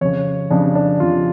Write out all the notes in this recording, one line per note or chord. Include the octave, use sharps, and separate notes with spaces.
F2 C#3 C#5
F2 C#3 D4
D4
F2 C#3 F4